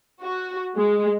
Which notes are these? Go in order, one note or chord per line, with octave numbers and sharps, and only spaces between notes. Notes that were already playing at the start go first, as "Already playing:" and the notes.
F#4
G#3